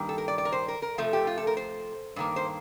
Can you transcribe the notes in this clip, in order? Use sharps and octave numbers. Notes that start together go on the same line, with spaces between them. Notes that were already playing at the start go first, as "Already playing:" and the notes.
Already playing: G2 D#3 G3 A#3
A4
A#4
D5
D5
A#4
C5
A#4
A#4
C3 F3 A3
G4
F4
A4
A#4
C5
G2 D#3 A#3
C5